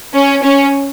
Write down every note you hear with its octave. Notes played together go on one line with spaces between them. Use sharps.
C#4
C#4